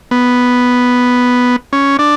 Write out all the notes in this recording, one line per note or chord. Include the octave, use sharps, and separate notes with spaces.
B3
C#4
D4